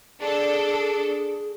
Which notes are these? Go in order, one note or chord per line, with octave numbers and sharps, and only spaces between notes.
D4 G#4 A4